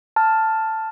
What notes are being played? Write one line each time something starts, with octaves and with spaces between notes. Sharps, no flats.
A5 F6